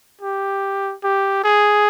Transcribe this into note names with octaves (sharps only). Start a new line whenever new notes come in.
G4
G4
G#4